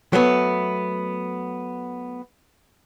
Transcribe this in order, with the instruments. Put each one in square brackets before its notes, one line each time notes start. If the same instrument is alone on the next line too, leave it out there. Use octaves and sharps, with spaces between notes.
[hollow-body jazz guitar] F#3 A3 B3